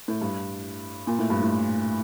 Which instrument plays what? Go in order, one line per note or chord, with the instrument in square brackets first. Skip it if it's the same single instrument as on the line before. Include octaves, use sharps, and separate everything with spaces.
[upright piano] A2
G2
A#2
A2
G2
A2